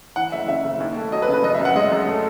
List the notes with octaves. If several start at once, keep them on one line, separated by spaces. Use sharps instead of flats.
E3 F#5
F#1 E5
C#3 E5
F#1
D#2
A3
F#3 D#5
B4
C#3
B4
F#2 D#5
E5
F#2
F#5
G#3 D#5
F#2
A3